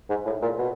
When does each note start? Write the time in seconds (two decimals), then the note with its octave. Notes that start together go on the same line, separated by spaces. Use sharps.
0.10 G#2
0.26 A2
0.42 A#2
0.59 B2